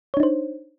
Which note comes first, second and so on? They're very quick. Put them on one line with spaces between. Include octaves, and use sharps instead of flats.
C#5 D4 D#4 C5